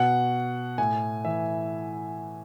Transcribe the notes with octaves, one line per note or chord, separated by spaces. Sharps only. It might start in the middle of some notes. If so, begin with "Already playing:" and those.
Already playing: B2 F#5
A2 G#5
E3 E5